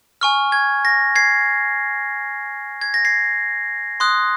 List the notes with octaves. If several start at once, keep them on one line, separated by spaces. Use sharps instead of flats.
G#5 C#6 F6
G#6
A#6
G#6 C7
G#6
A#6
G#6 C7
C6 D#6 F#6